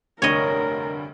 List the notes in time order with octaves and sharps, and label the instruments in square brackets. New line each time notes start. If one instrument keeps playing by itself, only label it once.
[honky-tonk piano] F1 D2 G2 [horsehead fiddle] A#4 [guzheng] C#5 D#5